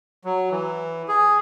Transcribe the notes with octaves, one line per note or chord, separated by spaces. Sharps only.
F#3
E3
G#4